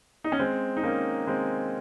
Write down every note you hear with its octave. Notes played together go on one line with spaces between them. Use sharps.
D#4
C#4
G#3 C4
D#4
A#3 C#4
G#3 C4